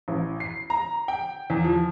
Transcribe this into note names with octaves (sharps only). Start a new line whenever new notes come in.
A1
C7
A#5
G5
E2
F3